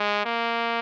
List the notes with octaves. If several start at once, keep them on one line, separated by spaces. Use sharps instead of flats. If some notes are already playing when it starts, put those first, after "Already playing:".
Already playing: G#3
A#3